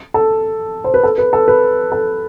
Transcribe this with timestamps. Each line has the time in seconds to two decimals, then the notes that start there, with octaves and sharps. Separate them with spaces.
0.14 A4
0.84 C5
0.94 B4
1.03 A4
1.18 B4
1.33 A4
1.48 B4
1.92 A4